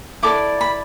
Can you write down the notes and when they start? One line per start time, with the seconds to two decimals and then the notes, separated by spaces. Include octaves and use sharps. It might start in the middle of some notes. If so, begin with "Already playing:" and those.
0.23 E4 A4 D5 D6
0.61 B5